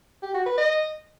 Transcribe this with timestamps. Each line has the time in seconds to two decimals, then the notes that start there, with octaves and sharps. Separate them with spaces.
0.22 G4
0.34 F#4
0.46 B4
0.58 D#5